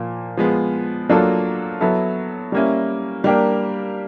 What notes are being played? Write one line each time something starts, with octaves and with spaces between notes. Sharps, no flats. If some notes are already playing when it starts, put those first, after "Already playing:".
Already playing: A#2 F3 A#3
F3 G#3 B3
F#3 A#3 D4 F4 A4
F#3 B3 E4 A4
G3 A#3 C#4 E4
G3 A#3 D4 G4 A#4